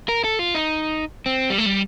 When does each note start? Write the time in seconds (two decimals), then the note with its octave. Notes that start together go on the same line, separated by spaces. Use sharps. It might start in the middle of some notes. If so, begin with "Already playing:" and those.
0.09 A#4
0.24 A4
0.39 F4
0.55 D#4
1.26 C4
1.50 G3
1.58 A3
1.66 G3